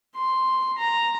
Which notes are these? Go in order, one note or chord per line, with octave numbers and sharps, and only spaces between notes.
C6
A#5